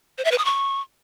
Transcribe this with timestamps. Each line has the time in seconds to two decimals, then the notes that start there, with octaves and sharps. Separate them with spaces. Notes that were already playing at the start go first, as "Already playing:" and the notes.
0.18 C5
0.25 E5
0.32 B4
0.38 D#6
0.45 C#6